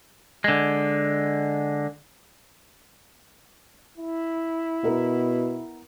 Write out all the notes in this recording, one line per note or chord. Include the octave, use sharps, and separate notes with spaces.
D3 G#3
E4
B2 B3 A#4